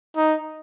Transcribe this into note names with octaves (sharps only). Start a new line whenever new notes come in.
D#4